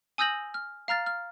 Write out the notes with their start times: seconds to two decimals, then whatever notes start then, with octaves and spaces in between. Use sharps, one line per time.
0.18 G#5 D#6 E6 G6 A#6 F#7
0.54 F6
0.88 F5 A#5 F6 A6
1.06 F6